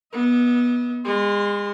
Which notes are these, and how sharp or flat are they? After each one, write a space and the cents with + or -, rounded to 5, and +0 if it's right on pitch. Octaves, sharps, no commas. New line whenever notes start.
B3 -20 D#5 +45
G#3 -35 C6 +0